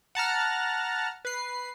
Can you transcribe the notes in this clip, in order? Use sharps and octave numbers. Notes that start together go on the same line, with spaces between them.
F#5 A5 A#5 F6
B4 C7